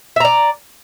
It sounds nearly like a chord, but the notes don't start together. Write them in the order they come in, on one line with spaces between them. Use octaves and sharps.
E5 A#5 D5